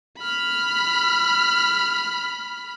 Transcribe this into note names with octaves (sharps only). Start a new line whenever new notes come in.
B5 F6